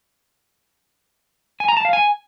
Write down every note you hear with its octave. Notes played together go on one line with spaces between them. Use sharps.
G#5
A#5
A5
F5
G#5